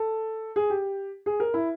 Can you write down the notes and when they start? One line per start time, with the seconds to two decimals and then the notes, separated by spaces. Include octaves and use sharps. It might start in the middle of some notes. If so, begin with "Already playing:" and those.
Already playing: A4
0.56 G#4
0.70 G4
1.26 G#4
1.40 A#4
1.54 E4